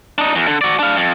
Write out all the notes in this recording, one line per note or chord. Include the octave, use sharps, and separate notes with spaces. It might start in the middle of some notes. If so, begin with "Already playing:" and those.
D4 D#4
E2
D3
F#4 D5
D4 F5
F2